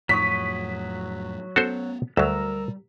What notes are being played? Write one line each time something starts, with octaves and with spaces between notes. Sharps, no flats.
F2 A2 F3 F#3 C#6 D#6 B6
B3 C#4 F#4 A4 C5
D2 F#3 G3 A#4 A#5 E6